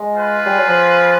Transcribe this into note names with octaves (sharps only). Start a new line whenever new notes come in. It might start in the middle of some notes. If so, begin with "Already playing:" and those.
Already playing: G#3
F4 G#4 B4
G3
F#3
F3